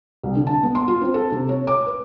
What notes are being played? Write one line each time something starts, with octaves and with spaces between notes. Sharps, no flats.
C2
D3
A5
B3
C6
F4
C4
A4
C3
C#5
D6
B4